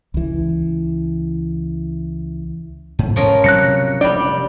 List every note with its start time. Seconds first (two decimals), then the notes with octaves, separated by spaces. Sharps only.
0.14 C#2 E3
2.99 G#2
3.16 F3 C#4 A#4
3.44 C3 F#3 G3 F#6 A#6 C#7
4.01 F1 G3 D4 D5 G5